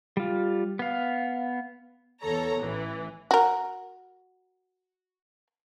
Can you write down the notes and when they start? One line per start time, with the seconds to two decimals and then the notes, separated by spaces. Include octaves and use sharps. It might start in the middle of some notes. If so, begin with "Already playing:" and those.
0.17 G3 F4
0.79 B3 F5
2.22 E2 A4 C#5 A#5
2.60 A1 E3
3.31 F#4 A#4